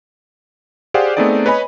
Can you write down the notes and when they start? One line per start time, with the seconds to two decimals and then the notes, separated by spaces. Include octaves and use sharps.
0.94 G4 G#4 C5 D5 F5 F#5
1.17 A3 B3 C4 D#4 G#4 D5
1.46 B4 C#5 D#5 G#5 B5